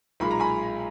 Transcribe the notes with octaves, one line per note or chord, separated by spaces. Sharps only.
B1 A#2 G#3 B5
A#5
G#5 B5